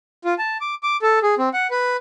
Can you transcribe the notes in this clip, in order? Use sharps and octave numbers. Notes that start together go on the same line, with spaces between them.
F4
A5
D6
D6
A4
G#4
C4
F#5
B4